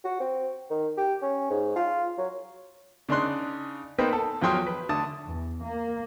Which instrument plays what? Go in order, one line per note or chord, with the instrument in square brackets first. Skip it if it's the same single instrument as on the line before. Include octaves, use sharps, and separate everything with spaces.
[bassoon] F#4
C4
D#3
G4
C#4
G#2
F4
F#3
[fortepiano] C#3 D4 D#4 C6 F#6
A#3 B3 D#4 B4 C5 G5
A4
E2 F3 F#3 G5 C6 D#6
B4
D3 A3 A5 D#6
[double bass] E2
A#3